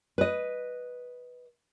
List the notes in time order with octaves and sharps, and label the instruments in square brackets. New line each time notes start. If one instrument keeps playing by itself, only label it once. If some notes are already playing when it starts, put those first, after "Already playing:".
[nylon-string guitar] B4 D#5